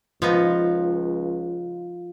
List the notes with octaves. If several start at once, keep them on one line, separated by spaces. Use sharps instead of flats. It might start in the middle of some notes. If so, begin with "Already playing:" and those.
C#2 F3 B3 D#4 F4